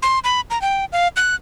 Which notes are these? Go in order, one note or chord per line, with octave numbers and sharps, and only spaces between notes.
C6
B5
A#5
G5
F5
F#6